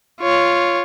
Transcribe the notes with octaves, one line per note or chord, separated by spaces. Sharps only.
F4 C#5